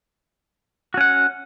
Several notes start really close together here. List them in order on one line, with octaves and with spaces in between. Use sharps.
F#4 C#4 F#5